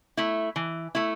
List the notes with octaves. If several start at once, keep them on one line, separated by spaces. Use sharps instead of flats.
A3 E4
E3
A3 E4